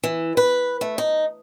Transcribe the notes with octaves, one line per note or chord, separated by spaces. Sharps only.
E3
B4
A3
D#4